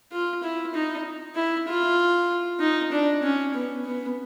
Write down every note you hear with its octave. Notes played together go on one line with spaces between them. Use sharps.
F4
E4
D#4
E4
F4
D#4
D4
C#4
B3
B3